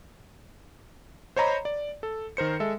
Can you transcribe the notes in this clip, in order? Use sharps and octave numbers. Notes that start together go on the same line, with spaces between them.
C5 C#5 D#5 A#5 B5
D5
A4
D#3 A#4 C5 C#7
G#3 A4 E5